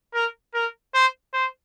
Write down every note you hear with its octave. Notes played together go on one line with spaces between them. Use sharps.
A#4
A#4
C5
C5